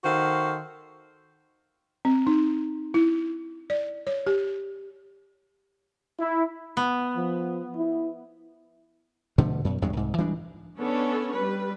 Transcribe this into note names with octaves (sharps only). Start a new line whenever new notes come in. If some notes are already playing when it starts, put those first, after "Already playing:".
D#3 F#4 A4 C5 F5
C4
D#4
E4
D5
C#5
G4
E4
B3
F3
E4
B2 D3 F3 A3
F#2 B2
E2 G2 F#3 G#3
C2 G#2
E3 G3 G#3 D4
B3 C#4 D4 A4 C#5
G3 B4